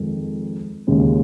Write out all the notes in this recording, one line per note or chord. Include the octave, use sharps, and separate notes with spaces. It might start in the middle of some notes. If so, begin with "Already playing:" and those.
Already playing: F2 D#3 G#3
D#2 C#3 G#3 C#4